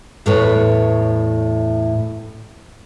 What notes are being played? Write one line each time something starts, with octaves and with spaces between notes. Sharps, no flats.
E2 A2 A4 B4 C#5